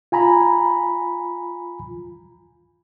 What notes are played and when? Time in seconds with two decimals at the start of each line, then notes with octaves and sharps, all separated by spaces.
0.12 F4 G#5 A#5 B5